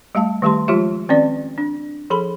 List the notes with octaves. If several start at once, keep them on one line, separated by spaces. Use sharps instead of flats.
G3 A3 F5 A5
D#3 G3 A3 G4 A5 C6
F3 G#3 F4 G4 E5
D#3 C4 C#4 D5
D4
F3 G#4 A4 B5